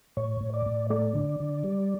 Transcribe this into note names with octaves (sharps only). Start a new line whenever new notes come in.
A2 C#5
A2
D5
A2
A3 D5
D3
D3
G3